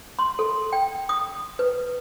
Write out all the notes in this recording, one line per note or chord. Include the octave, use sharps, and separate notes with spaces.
C6
A4
G5
D#6
B4